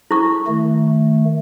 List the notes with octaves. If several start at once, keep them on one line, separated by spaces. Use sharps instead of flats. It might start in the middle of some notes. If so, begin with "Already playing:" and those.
E4 C#6
D#3 A3